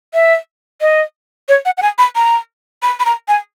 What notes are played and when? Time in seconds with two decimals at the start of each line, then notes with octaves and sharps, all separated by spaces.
0.14 E5
0.81 D#5
1.49 C#5
1.65 F#5
1.78 F#5
1.82 G#5
1.98 B5
2.16 A#5
2.83 B5
3.00 B5
3.05 A#5
3.28 G#5